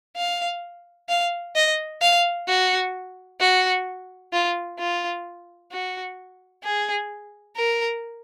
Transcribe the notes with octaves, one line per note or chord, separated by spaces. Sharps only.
F5
F5
D#5
F5
F#4
F#4
F4
F4
F#4
G#4
A#4